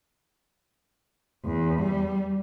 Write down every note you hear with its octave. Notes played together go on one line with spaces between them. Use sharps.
E2
G3